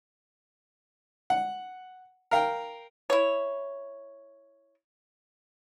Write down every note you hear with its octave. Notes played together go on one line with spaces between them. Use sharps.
F#5
A#4 F5 G5
E4 C#5